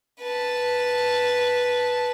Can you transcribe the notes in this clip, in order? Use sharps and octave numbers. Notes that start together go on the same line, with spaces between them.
B4 A5